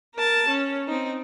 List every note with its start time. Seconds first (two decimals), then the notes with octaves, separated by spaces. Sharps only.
0.15 A#4 A5
0.48 C#4
0.88 C4 D#4